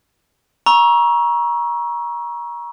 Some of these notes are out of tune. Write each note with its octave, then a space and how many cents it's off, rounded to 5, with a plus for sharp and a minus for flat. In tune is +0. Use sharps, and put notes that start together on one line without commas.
A#5 +30 C#6 +0 E6 +0